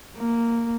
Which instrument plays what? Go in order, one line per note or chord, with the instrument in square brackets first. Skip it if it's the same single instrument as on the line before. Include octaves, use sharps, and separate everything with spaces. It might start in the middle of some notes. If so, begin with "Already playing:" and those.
[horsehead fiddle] A#3